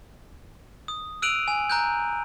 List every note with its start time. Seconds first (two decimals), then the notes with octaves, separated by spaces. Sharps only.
0.88 D#6
1.22 E6 F#6 D7 D#7 F7 F#7
1.48 G#5
1.70 A#5 F#6 G6